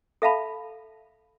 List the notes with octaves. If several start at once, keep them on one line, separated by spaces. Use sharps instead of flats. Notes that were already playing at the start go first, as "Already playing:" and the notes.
A4 E5 F5 A5 B5